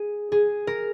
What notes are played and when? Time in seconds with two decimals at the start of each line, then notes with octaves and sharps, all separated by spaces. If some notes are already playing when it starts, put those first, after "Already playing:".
Already playing: G#4
0.32 G#4
0.67 A#4